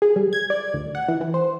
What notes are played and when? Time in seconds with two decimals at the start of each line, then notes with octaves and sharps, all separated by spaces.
0.02 G#4
0.16 G3
0.33 G#6
0.50 D5
0.74 D2
0.95 F#5
1.09 E3
1.21 E3
1.34 C5